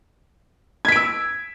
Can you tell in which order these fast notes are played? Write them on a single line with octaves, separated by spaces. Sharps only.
G#6 B6 D7 E6